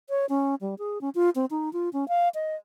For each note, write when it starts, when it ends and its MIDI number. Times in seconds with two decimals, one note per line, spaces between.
0.10 0.26 73
0.29 0.55 61
0.61 0.75 55
0.79 1.01 68
1.01 1.10 61
1.15 1.30 65
1.35 1.45 60
1.51 1.72 63
1.73 1.89 65
1.93 2.08 61
2.08 2.29 77
2.35 2.55 75